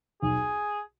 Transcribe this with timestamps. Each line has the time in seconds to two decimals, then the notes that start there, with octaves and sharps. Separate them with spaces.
0.22 B1 G#4